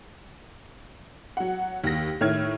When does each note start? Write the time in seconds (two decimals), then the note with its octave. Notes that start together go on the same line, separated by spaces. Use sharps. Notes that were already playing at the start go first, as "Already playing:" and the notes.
1.37 F#3 F#5
1.84 D#2 A#6
2.21 A2 D#3 C#5 E5 F6 G#6